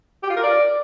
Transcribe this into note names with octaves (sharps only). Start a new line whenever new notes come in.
G4
F4
A#4
D5